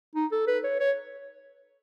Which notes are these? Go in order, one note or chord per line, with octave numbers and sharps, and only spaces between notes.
D#4
A4
B4
C#5
C#5